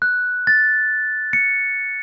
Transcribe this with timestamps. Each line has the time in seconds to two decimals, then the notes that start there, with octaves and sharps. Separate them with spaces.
0.02 F#6
0.47 A6
1.33 C#7